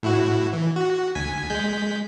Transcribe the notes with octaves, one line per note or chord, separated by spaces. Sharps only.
A2 E4 F#4
E3
F#4
D2 G#5 B6
G#3 G6 B6